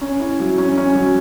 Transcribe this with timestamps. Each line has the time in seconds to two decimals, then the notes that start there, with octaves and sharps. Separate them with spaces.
0.01 C#4
0.20 E4
0.40 F#3
0.58 C#4
0.77 C#4
0.95 F#3